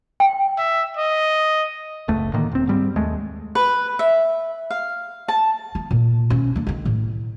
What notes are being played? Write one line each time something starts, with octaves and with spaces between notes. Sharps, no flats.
G5
E5
D#5
F#1 C#2 A3
A2 D3 D#3 A#3
E1 C4
G#2 G3 C4
D#2 G#3 A3
B4
E5
F5
A5
B3
A#2
B2 C#4
A#3 D4
D3 D#3
A2